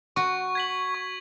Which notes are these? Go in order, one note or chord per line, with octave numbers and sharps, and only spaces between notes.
F#4 C#6
G#6 B6 F#7
C#6